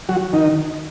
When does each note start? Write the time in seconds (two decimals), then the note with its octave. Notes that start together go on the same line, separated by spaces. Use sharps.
0.09 F#3 F#4
0.33 D#3 D#4